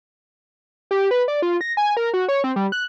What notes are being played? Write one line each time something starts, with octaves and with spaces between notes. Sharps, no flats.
G4
B4
D5
F4
A#6
G#5
A#4
F#4
C#5
C4
G3
F#6